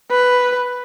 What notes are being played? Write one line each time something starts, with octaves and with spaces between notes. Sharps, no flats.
B4